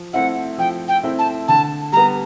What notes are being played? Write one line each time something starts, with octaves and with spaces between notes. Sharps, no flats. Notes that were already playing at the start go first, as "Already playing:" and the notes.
Already playing: F3
A3 C4 E4 F#5
F3 G5
G5
A3 C4 E4
A5
D3 A5
G3 B3 A#5